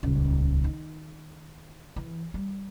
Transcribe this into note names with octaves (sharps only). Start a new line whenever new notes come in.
D#1 C#2
D#3
E3
G3